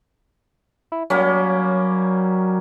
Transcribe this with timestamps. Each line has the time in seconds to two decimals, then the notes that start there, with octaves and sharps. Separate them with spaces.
0.92 E4
1.10 F#3 G3 A#3 C#4